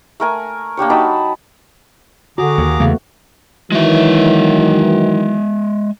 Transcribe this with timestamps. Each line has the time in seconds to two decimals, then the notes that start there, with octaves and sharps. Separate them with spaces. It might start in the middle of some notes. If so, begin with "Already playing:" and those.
0.20 A3 A#4 G#5
0.77 A#3 D4 G4 C#5
0.90 F#3 D#4 A5 B5
2.38 D3 F#4 G#4 A#5 D6
2.58 D#2 A#3
2.80 E2 C#3 A3 B3
3.72 D#3 E3 F#3 G#3 E5